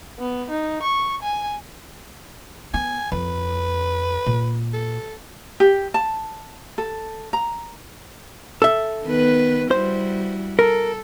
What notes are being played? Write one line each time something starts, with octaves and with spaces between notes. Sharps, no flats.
B3
D#4
C#6
G#5
B3 G#5
F2 B4
A#2
A4
G4
A5
A4
A#5
A4 E5
D#3 B3 B4
G3 E4 F#4 C5
A4 A#4